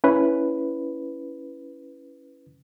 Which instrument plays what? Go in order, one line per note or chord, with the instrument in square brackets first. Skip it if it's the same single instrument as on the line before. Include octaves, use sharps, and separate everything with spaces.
[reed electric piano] C#4 E4 B4